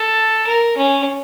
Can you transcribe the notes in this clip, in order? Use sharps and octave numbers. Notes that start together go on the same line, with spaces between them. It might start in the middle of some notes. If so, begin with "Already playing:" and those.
Already playing: A4
A#4
C#4